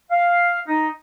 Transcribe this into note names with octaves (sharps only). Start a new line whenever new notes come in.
F5
D#4